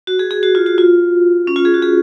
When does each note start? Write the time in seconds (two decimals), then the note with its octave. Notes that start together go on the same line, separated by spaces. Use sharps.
0.07 F#4
0.19 G#4
0.31 G#4
0.43 F#4
0.55 F4
0.66 F#4
0.78 F4
1.47 C#4
1.56 F4
1.65 G#4
1.74 F#4
1.82 G#4